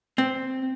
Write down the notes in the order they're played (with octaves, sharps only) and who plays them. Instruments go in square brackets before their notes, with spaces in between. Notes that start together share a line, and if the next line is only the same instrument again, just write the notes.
[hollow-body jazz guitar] C4